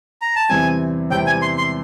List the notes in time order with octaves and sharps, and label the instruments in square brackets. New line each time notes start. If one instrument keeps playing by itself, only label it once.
[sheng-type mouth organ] A#5
A5
[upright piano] E2 C3 E3 G3 C4 [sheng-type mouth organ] G#5
[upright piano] E2 C3 E3 G3 C4 [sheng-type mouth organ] G5
[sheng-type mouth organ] G#5
C6
C6